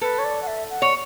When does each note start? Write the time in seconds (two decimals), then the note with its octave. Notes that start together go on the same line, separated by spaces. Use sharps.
0.01 A4 B4
0.19 C#5
0.24 D5
0.43 F#5
0.47 E5
0.70 F#5
0.82 C#5